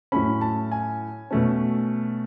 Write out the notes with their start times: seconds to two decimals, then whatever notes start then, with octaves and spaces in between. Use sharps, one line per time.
0.12 A2 F#3 A3 C#4 B5
0.41 A5
0.72 G#5
1.31 B2 A3 C#4